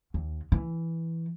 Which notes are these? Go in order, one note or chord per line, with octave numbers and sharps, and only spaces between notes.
D#2
E3